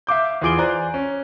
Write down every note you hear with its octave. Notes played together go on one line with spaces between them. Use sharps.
E5 F5 D6 G6
E2 F4 G#4 D6 D7 G7
C5 D5 G#5 A#5 F#6
C#4